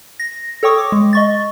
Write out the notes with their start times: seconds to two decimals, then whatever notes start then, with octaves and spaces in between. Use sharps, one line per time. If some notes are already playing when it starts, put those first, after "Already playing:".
0.20 A#6
0.63 A4 C#5 G5 C#6 D#6
0.78 D6
0.92 G#3
1.13 D#5 C#6 A6